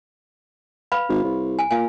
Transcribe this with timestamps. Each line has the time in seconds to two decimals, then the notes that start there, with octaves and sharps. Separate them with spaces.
0.92 B4 F5 B5
1.09 G#1
1.24 C2
1.59 G#5
1.71 A#2 F5 G#5